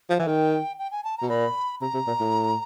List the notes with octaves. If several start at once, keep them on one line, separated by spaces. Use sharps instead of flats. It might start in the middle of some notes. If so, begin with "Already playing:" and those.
F3
E3 F#5
D#3 G5
G5
G#5
A5
B2 A#5
A#2 B5
C3 A#5
C3
A#2
A2